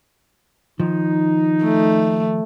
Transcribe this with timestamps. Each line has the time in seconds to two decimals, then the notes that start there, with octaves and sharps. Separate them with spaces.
0.80 D#3 F3 D#4
1.64 A3